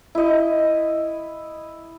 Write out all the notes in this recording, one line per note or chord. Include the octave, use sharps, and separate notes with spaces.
E4 D#5